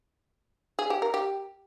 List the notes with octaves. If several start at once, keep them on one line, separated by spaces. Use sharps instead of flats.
G#4
G4
A#4
G4